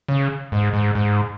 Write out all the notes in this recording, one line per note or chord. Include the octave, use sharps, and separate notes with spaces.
C#3
G#2
G#2
G#2